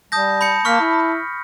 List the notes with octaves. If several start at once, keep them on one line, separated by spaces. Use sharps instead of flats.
G3 A5 D#6 G6 A#6
B5 G6 C#7
A#3 C#6 F6 B6
E4